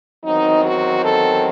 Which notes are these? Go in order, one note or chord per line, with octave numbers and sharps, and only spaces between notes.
E2 D#3 F#3 C4 D#4
F#4
A4